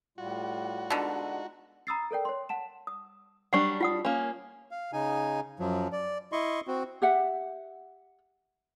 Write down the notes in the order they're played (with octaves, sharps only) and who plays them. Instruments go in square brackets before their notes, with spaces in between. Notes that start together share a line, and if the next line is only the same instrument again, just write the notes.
[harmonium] A2 G3 F4 [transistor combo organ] F#4
[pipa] B2 D3 [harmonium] G#3 D#4 F4
[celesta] A#5 B5 D#6 E6 A6 C7
A4 A#4 D5 G5
C#5 C6
F#5 A5 E7
[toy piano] D#6
[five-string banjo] F#3 G3 D4 [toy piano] F#5 C#6
[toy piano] F4 F#5 D#6
[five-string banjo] A#3 C#4
[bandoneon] F5
C#3 D#4 G#5
F#2 F3 F#3
D5
E4 D#5 C6 C#6
C4 F#4
[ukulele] G4 E5 F#5